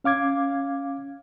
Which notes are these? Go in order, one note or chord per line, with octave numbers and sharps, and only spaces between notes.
C#4 F5 D6 G#6